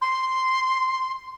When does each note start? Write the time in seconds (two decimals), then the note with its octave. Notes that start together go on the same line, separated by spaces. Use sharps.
0.01 C6